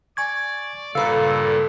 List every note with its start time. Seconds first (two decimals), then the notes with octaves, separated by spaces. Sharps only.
0.17 D5 G#5 C#6 G#6
0.95 G2 A#2 C#3 A4 B4 F5 A#5